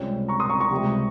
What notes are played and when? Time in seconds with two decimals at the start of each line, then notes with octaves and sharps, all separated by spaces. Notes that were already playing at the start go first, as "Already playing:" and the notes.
Already playing: C#2 C3 G3 C#4
0.28 A#5 C#6
0.40 C6 D#6
0.50 A#5 C#6
0.60 A#5 C#6
0.71 C#2 C3 G3